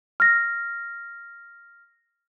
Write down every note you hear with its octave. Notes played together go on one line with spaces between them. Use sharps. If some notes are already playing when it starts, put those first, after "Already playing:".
F6 A#6